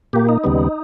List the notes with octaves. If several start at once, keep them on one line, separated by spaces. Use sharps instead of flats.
A#2 A#3 G4
D#4
D#2 C#3 G3 B3